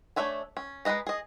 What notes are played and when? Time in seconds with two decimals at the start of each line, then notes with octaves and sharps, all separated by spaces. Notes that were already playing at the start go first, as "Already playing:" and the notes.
0.16 A3 D4 C#5 E5 G#5
0.57 C#4
0.85 G#3 C4 B4 D#5 A#5
1.07 G#4 D#5